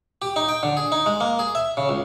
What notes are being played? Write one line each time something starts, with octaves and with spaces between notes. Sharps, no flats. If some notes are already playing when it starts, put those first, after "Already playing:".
G4
D#4
G5
D3
G#4
D#4
G#3
A#3
G#4
E5
C#3
C#2